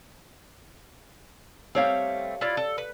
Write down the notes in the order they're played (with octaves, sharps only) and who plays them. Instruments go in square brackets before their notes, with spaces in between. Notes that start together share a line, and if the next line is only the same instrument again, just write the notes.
[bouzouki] G3 A3 C4 [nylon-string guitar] G4 C#5 F5
[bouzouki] E4 F4 D5
A4
B4